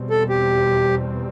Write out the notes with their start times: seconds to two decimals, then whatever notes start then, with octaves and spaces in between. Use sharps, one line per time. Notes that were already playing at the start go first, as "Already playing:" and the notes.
Already playing: E2 B2 G3 C4
0.10 A4
0.29 G4